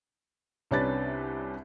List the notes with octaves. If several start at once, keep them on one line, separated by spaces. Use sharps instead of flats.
C2 C3 C#4 D4 B4 A6